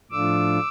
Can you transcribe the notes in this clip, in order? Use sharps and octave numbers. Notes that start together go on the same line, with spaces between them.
A2 F3 A3 D4 F4 D6 E6